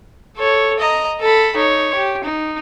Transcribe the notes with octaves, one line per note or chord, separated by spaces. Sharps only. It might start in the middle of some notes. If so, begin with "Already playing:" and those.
A4 C#5
D#5 A#5
A4 B5
D#4 C#5
G4
D#4